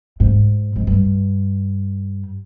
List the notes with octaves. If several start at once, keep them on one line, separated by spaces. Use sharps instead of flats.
G#2
G#2
G2